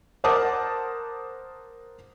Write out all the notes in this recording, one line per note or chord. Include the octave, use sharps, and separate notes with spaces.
A#4 C5 F#5 A5 D6 D#6